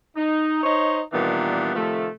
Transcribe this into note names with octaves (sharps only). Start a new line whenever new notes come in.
D#4
D#4 C5 C#5 D#5
A#2 D#3 E3 G3 B3 D4
C3 D#3 F3 A3